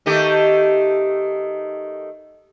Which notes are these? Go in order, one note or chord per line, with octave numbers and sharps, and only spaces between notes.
D#3 A3 G4